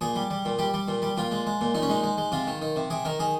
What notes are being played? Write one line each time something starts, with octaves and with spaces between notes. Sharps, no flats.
A#2 G#4
G3
G3
A#2
G3 G4
G3
A#2
G3
A#2 F4
G#3
G#3
A#2
A#2 D#4
C#4
G#3 D#4
G#3
G#3
C3 F4
D#3
D#3
C3
C3 G#4
D#3 A#4
D#3 G#4